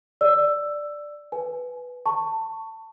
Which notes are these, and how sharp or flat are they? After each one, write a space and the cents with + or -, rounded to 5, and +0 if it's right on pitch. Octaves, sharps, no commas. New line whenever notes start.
D5 +0 E6 +10
B4 +0 G#5 +25
A5 +20 C#6 +0